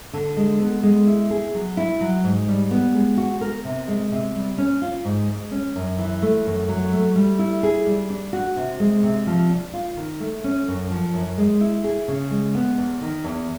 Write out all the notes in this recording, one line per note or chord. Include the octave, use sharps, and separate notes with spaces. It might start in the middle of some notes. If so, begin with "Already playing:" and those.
D3
G#3
B3
G#3
E4
G#4
F#3
E4
F#3
G#2
G3
B3
G#3
F#4
A#4
C3
G#3
C3
G3
C#4
F4
G#2
G#3
C#4
F#2
E3
A3
F#2
F#3
A3
G3
E4
G#4
G3
D4
F#4
C3
G#3
C3
F3
D4
F4
D#3
A3
C#4
F#2
F3
F#2
G#3
E4
G#4
C#3
G#3
B3
E2
D#3
E2